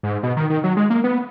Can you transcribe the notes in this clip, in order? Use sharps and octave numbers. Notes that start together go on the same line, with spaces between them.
G#2
B2
D#3
D#3
F#3
G#3
A#3
B3